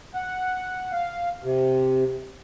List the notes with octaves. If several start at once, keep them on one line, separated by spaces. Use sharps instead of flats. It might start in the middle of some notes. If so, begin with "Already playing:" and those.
F#5
F5
C3